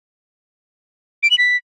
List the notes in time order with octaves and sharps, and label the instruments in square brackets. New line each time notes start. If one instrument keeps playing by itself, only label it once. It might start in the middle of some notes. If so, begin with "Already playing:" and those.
[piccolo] D7
F#7
B6